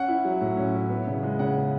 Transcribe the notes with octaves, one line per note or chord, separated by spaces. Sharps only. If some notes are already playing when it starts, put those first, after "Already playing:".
Already playing: C#4 F#5
E4
F#3
A2
C#4
E4
B3
C#3
G#3
C#3 F#5
B3